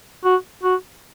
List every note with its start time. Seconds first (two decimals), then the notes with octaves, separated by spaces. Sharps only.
0.24 F#4
0.63 F#4